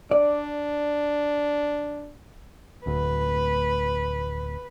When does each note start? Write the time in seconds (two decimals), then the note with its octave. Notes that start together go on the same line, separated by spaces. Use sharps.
0.11 D4 D5
2.86 D1 D2 B4